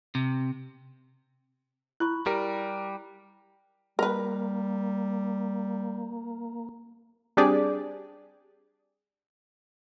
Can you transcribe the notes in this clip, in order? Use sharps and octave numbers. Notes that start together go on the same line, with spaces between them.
C3
E4 B5 C#6 F#6
G3 G4 A#4
G3 A#3 A#4 B4
G3 C4 D4 G4 G#4 D5